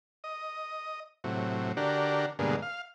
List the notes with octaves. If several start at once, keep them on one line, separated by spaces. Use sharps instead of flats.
D#5
A2 C3 F#3
D3 D4 F#4 G4 A#4
G2 B2 D3 G#3 A#3
F5